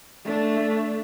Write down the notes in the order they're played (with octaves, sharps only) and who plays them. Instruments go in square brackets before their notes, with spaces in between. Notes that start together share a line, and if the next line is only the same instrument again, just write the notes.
[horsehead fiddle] A3 D4